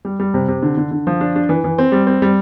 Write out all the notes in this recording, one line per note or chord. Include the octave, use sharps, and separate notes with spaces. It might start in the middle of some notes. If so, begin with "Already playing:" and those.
G3
G3
C3
C3
D3
D3
D3
F3
D4
D4
E3
E3
C4
G3
C4
G3